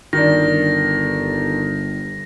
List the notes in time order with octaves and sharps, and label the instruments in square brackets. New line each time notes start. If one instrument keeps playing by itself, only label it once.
[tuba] G1 [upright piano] D#3 D4 [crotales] A#6